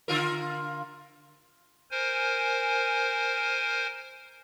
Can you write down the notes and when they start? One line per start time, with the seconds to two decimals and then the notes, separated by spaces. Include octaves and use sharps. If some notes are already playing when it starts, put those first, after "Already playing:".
0.08 D3 F4 A#4
1.91 A#4 C5 G#5